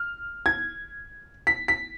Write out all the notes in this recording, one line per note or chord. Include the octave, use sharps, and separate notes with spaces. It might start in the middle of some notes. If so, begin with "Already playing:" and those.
Already playing: F6
G#6
B6
B6